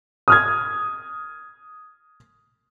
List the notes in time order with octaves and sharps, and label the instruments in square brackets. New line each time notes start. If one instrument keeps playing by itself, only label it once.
[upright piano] D#6 F6 G#6